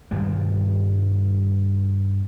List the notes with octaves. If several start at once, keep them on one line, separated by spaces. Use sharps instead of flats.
G2 B2 D#3 G3